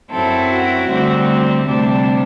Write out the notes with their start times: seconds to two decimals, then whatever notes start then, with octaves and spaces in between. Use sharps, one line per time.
0.11 F#2 F#3 C4 E4 A4
0.50 F#4
0.89 D2 D3 G3 C4
1.67 D2 C3 G3 D4